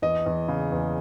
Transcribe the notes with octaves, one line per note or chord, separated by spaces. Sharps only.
E2 D#5
E2
C#3
E2